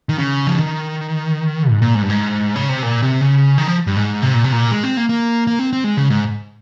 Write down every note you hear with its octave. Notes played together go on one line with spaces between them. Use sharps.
D#3
C#3
F3
D#3
G#2
A#2
G#2
G2
G#2
C#3
C3
A#2
C3
C#3
D#3
F3
G2
G#2
C3
A#2
C3
A#2
G#3
C4
A#3
A#3
A#3
C4
C4
G#3
C#3
G#2